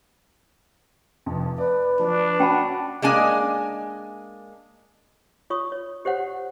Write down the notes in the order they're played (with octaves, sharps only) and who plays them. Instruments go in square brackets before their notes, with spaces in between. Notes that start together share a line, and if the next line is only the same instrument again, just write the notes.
[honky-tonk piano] F1 F2
[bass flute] B4 [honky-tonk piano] D5
[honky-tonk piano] F3 [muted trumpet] D4
[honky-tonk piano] C#4 F#4 F#5 [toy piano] G5 A5 B5
[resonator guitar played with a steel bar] G#3 A#3 D4 G#5
[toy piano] F4 C#5 C#6 D#6
C#5
G4 C5 C#5 F#5